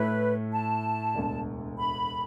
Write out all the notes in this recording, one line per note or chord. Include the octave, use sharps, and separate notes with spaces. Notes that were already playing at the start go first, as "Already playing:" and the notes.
Already playing: A2 A3 E4 B4
A5
E1 D2 D3
B5